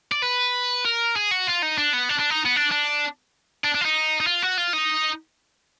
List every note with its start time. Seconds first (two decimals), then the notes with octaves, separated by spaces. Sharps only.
0.12 D5
0.22 B4
0.85 A#4
1.16 G#4
1.31 F#4
1.48 F4
1.63 D#4
1.78 D4
1.93 B3
2.09 D4
2.19 D4
2.30 D#4
2.45 B3
2.56 D4
2.71 D4
3.64 D4
3.75 D4
3.81 F4
3.85 D#4
4.20 D#4
4.27 F4
4.42 F#4
4.57 F4
4.73 D#4